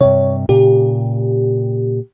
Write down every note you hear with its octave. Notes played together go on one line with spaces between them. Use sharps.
G2 C3 C#5
A#2 C#3 G4